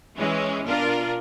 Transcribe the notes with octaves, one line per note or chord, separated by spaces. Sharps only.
E3 G#3 C#4
B2 D4 F4 A#4